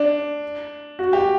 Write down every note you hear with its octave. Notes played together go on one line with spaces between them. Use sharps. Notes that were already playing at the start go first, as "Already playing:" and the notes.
Already playing: D4
F#4
G4